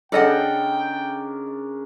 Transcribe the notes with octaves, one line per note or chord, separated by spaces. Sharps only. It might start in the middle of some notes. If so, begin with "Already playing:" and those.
C#3 D4 A4 A#4 D#5 F#5 G5